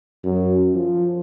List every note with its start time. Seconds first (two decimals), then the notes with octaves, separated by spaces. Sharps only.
0.24 F#2
0.75 F3